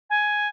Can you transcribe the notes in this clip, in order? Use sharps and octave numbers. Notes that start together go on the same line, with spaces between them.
G#5